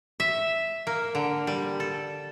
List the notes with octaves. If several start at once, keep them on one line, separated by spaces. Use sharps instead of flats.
E5
A#3
D3
G3
A4